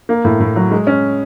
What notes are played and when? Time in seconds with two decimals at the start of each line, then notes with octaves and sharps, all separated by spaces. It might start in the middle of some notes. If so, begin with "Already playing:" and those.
0.09 A#3
0.25 A2
0.40 A2
0.56 F#3
0.71 G#3
0.87 C#4